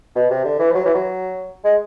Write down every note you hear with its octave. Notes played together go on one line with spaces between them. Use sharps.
B2
C3
D3
E3
F3
F#3
E3
F#3
G#3